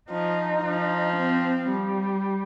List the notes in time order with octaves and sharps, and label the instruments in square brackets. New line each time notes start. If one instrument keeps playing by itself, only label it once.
[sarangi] F3 [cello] D#4
[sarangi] F3
[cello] C4
G3